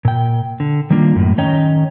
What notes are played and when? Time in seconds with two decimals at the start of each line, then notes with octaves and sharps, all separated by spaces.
0.05 A#2 G5
0.60 D3
0.90 D#3 G3 A#3 D4 F4
1.16 F#2 A2
1.38 D#3 C#4 C#5 D#5 G5 A#5